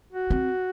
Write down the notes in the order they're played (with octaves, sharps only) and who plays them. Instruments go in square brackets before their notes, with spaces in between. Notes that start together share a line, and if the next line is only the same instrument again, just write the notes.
[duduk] F#4
[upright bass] C4